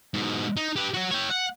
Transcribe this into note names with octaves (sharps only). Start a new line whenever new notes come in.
G#2 B2
D#4
G4 B4
F#3 F#4
C#5 G5
F#5